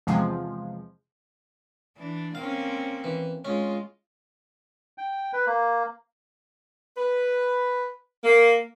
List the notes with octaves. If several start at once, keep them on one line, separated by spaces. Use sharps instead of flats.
E2 C3 F3 G#3
E3 D4
A#3 C4 C#4 F5
E3
G#3 C#4 F4
G5
B4
A#3
B4
A#3